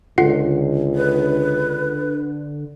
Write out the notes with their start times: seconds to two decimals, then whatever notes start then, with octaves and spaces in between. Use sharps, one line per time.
0.18 C#2 D3 F4 F#5 C7
0.95 B4